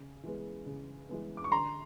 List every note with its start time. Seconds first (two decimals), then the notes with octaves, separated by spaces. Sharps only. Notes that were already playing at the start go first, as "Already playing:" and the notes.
Already playing: C#3
0.23 E3 G#3 B3
0.66 C#3
1.09 E3 G#3 B3
1.37 D6
1.44 C#6
1.51 D3 A#5 C6